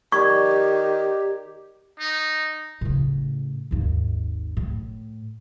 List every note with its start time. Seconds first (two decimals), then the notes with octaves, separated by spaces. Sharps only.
0.12 D#3 G4 D5 C#6 G#6
1.99 D#4
2.81 A2 C#3
3.71 G#1 D#2
4.57 A2